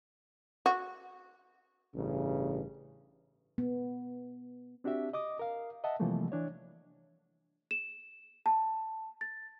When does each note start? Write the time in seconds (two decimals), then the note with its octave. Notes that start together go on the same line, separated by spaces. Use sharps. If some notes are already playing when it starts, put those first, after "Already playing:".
0.66 F#4
1.95 A1 G2 C#3
3.58 B3
4.84 C4 D4 F#4 G4 E5
5.13 D#5 D6 D#6
5.39 A#4 F5
5.84 D#5 E5 F#5 A5
6.00 C3 E3 F3 G3 A3 A#3
6.32 E3 D4 C#5
7.71 E7
8.46 A5
9.21 A6